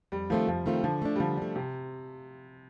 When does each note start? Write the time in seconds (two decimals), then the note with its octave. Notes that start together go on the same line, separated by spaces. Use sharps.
0.12 F2 G3
0.30 D#3 F3 A3 C4 F4
0.48 F2 F3
0.66 D#3 A3 C4 F4
0.84 D3 F3
1.02 A3 D4
1.16 G3
1.20 D3 F3
1.37 A3 D4
1.56 C3